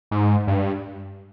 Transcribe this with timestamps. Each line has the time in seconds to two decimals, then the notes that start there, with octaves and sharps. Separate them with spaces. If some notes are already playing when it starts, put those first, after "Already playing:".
0.11 G#2
0.47 G2